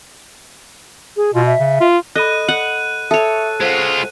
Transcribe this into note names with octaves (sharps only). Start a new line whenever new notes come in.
G#4
B2 F4
E5
C#3
F4
A4 D#5 B5 F#6 D#7
F#5
A4 C#5 E5 D#6
G#3 F4 C5 F#5